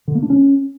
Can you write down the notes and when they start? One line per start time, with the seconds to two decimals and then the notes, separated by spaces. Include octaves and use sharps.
0.08 D3
0.15 A#3
0.22 D4
0.30 C#4